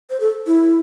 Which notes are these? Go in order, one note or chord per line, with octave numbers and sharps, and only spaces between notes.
C5
A4
E4